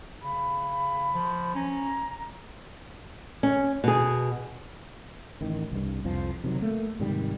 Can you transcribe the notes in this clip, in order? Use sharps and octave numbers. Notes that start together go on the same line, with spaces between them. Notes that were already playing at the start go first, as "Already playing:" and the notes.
C#3 B5
F3
C#4 A#5
C#4
B2 G#4
A1 D#3
C2 G2
C2 F2 F3
C3 D#3 F#3
A3 A#3
G#2 C3 D#3 G3